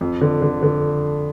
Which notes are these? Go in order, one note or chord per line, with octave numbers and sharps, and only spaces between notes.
F2
D3
D3
D3